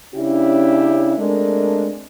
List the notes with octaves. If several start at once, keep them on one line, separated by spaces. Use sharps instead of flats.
C#3 C#4 D4 E4 G4
G#3 A3 C4 D4 A#4